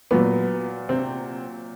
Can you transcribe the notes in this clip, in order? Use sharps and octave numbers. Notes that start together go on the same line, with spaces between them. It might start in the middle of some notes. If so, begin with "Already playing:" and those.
A#2 F#3 B3
C3 C4